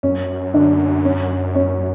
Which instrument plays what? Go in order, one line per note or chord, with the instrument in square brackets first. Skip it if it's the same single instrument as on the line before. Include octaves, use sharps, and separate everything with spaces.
[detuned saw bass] F#2 [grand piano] C#4
[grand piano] D3 D4
C#4
C#4